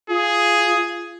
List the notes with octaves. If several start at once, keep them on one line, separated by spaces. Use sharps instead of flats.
F4 G#4